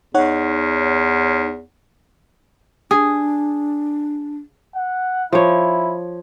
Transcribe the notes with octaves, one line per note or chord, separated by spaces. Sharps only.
E2 D#4 C#5 F#5
D4 G#4
F#5
F3 E4 C#5